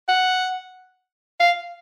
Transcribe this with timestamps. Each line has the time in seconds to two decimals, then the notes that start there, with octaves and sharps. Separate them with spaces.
0.08 F#5
1.40 F5